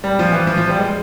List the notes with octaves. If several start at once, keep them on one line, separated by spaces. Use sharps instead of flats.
G3
F3
E3
F3
F3
G3
G#3